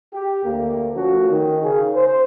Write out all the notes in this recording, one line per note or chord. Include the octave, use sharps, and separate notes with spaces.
G4
D2 A#3
F3 A3 C#4 F#4
D#3
C#3 G#4
C5